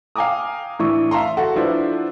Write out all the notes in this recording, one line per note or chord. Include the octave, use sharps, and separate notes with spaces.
F5 G5 G#5 A#5 D6 D#6
A2 E3 D4 E4 C#6
E5 F5 A5 A#5 C6
F#4 A4
F3 D4 E4 F4 B4 C5